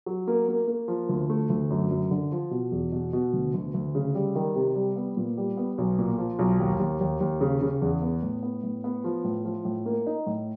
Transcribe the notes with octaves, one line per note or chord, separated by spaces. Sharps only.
F#3
A#3
A#3
A#3
F3
D2
A3
D2
F#2
F#2
D3
F3
B2
E2
B2
B2
D2
D2
D2
C#3
G3
D#3
C3
G3
B3
A#2
G3
B3
B1
A#2
F3
B1
D#2
D#2
D#2
D#2
C#3
C#3
E2
B3
A2
B3
A2
B3
F3
A2
F3
A2
A#3
D#4
A2